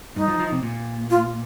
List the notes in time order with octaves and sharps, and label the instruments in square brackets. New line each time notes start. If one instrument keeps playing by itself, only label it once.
[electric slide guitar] G2 [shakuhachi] D#4
[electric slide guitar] F3
F3
C3
A#2
[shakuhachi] F4